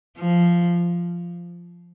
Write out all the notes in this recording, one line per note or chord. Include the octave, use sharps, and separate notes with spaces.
F3